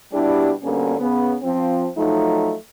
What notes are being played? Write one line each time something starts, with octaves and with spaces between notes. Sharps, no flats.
B2 G3 D4 E4 G4
G2 B2 D3 A#3 C#4
C#3 B3
F3 C4
F3 F#3 A3 D#4